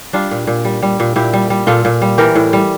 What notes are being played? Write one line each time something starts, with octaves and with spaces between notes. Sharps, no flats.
G3 D4 F4
A#2
A#2
G3
G3
A#2
A#2 E4 G4
G3
G3
A#2 F4 A4
A#2
G3
E3 G4 A#4
A2
G3